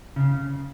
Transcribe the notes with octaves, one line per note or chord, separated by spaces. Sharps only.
C#3